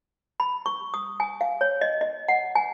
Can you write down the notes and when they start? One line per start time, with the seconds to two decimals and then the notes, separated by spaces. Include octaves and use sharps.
0.40 B5
0.66 C#6
0.94 D#6
1.20 G#5
1.41 F5
1.61 C#5
1.81 D#5
2.01 D#5
2.28 F#5
2.55 G#5